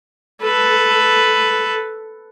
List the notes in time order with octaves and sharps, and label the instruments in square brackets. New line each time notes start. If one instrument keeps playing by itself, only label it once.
[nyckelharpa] A4 B4